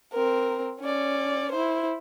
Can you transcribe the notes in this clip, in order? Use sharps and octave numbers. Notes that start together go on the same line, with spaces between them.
C4 A#4
C#4 D5
E4 C5